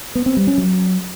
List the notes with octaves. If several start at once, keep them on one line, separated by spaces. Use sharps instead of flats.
B3
C4
G3
C#4
F#3